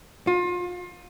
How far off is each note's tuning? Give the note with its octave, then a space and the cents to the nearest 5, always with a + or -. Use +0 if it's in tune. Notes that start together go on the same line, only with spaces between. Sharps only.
F4 +30